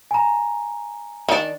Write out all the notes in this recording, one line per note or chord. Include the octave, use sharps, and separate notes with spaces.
G#5 A#5
D#3 D4